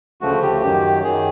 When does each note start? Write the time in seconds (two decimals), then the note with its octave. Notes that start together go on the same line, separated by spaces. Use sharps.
0.21 D2 C#3 F3 A3 F#4
0.42 G4
0.62 F#2 D#3 F#3 G4
1.03 F#2 D#3 F#3 G#4